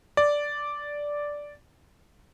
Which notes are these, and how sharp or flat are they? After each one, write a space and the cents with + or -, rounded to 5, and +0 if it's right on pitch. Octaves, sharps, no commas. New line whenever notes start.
D5 -5